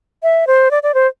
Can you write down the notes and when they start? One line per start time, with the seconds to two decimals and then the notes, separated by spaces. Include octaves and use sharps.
0.23 E5
0.47 C5
0.71 D5
0.83 D5
0.94 C5